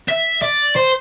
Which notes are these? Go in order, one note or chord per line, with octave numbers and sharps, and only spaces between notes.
E5
D5
C5